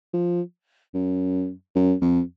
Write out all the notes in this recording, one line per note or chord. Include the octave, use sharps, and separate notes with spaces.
F3
F#2
F#2
F2